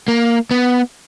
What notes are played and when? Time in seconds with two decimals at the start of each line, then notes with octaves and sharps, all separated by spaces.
0.08 A#3
0.51 B3